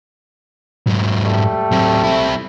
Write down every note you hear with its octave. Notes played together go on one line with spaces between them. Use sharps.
G#2 F#3
G3 A3
F#3 C4
C4 E4